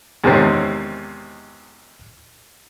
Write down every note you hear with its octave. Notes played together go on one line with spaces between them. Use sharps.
E2 G#2 C3 D#3 C4 C#4